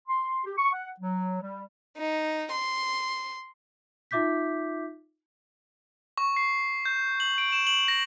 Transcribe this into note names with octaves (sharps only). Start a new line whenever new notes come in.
C6
G4
C#6
F#5
F#3
G3
D#4
C6
D#4 F4 E5 D6 G6 B6
C#6
C7
G6
F#7
D7
E7
F#7
A#6